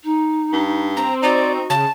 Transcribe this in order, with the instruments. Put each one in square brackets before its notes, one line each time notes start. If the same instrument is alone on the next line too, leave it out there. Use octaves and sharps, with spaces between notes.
[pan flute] D#4
[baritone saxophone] G2
[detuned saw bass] C4 [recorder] A#5
[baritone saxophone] D#4 [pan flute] F#4 [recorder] D5
[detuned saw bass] C#3 [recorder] A5